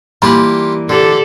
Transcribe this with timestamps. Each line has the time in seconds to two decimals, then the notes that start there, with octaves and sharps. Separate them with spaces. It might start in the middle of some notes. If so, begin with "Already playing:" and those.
0.22 E3 G3 A#3 F4 G4 B5 C6
0.89 D3 G4 A4 D5